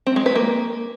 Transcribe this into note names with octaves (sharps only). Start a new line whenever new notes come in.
C4
G#3
B4
A#3